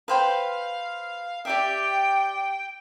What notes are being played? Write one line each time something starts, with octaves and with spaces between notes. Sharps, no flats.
B4 C5 F5 G5
G4 D5 E5 G5